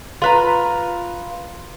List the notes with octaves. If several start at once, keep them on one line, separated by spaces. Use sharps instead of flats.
F4 B4 A#5